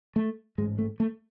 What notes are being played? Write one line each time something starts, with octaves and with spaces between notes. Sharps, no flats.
A3
A1 G#2 G#3
A3
A3